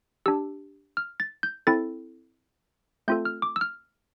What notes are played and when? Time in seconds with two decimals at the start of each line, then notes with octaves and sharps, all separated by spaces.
0.26 D4 G4 E6
0.97 F6
1.20 A6
1.43 G6
1.67 C4 E4 A4 A6
3.08 A3 C4 F4 A4 G6
3.25 F6
3.42 D6
3.56 E6
3.61 F6